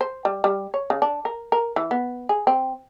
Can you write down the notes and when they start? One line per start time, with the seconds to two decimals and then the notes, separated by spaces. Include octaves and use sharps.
0.01 C5
0.25 G3
0.44 G3
0.74 C#5
0.90 C#3
1.02 D4
1.25 A#4
1.52 A#4
1.76 E3
1.91 B3
2.29 G#4
2.47 C4